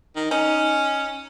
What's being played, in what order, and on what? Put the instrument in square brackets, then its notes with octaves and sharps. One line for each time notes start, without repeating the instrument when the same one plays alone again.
[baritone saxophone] D#3
[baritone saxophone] C#4 [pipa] D#4